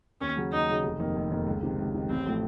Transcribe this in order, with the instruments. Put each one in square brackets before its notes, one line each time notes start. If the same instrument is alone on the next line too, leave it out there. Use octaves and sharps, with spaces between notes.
[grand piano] D#2 [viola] C#4
[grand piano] C#3 F#3
[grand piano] D#2 [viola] D#4
[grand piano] C#3 F#3
F1
F2 D#3 A#3 D#4
F1
F2 D#3 A#3 D#4
C#2
C3 D#3
C#2
C3 D#3
[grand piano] A1 [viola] C4
[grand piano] A2 F3 A3